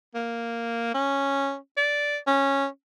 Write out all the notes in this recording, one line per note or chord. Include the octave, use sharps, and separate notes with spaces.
A#3
C#4
D5
C#4